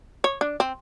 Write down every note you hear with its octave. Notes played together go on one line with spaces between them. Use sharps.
C#5
D4
C4